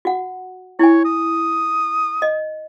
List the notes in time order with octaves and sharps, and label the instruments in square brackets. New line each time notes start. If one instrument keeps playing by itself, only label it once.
[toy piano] F#4 F#5
[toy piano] E4 G#5 [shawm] C#5
[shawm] D#6
[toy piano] D#5